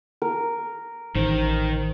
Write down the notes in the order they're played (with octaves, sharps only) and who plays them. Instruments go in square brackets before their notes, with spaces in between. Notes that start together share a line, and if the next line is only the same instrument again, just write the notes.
[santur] A#4
[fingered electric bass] A1 [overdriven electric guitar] D#3 [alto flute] C5